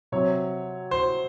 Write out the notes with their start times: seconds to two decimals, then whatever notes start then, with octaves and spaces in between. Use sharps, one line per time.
0.12 C3 F#3 C4 C#5
0.91 C5